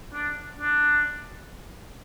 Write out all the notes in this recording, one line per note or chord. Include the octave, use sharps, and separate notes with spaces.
D4
D4